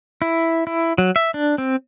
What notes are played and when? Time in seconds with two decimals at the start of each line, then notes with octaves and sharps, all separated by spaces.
0.22 E4
0.67 E4
0.98 F#3
1.16 E5
1.34 D4
1.58 C4